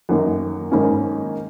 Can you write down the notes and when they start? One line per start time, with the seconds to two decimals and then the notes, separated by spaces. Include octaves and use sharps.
0.09 F#2 D#3 A#3
0.71 G#2 D#3 A#3 C#4